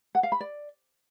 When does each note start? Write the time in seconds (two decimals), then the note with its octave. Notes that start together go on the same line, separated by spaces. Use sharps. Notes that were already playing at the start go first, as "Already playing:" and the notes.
0.15 F#5
0.23 F5
0.32 B5
0.40 D5